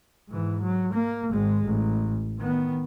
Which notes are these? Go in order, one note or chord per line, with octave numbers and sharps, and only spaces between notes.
G#2 E3
F#3
A#3
G#1 G#3
A1
D#3 B3